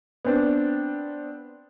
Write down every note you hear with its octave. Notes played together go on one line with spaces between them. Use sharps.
B3 C4 D4